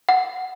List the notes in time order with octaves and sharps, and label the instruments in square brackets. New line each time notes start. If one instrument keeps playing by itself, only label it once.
[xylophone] F#5